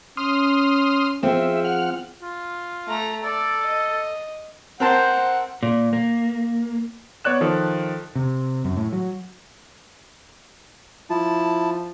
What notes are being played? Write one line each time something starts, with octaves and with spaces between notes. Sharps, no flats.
C#4 C6 D#6 F6
F3 C4 G#4 E5
F#5 F6
F4
A3 A#5
A4 D5
D#5
C4 A#4 C5 F#5 A5 A#5
A#2
A#3
B3 C#5 D5 F#6 E7
D#3 F3 A4
C3
F#2
A2
F#3
F3 E4 A5